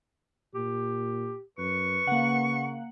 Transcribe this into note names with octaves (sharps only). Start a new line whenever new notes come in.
A#2 G4
F#2 B4 C#6
C#3 A#3 F#5